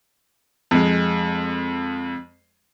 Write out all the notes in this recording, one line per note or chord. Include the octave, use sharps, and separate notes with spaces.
F2 G#3